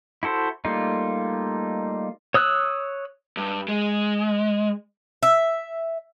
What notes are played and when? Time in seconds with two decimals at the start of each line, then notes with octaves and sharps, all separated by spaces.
0.23 E4 F#4 A4 C5
0.65 G3 A3 A#3 D#4 F4
2.34 C#5 D#6 E6 F#6
3.37 G2
3.68 G#3
5.23 E5